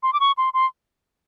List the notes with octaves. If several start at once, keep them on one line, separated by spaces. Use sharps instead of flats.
C6
D6
C#6
C6
C6